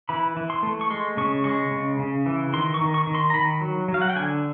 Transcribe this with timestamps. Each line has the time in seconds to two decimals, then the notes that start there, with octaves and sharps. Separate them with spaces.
0.09 E3 B5
0.37 E3
0.50 C6
0.63 A3
0.81 C#6
0.90 G#3 C6
1.17 C#3 C#6
1.44 G#3 C#6
1.71 C#3
1.99 C#3
2.26 E3
2.53 D#3 C6
2.74 C#6
2.81 D#3
2.94 C#6
3.07 D#3
3.15 C6
3.30 A#5
3.34 D#3 B5
3.61 F#3
3.88 F#3
3.94 F5
4.02 F#5
4.10 G5
4.16 D3 G#5